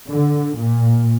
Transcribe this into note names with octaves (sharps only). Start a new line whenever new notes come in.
D3
A#2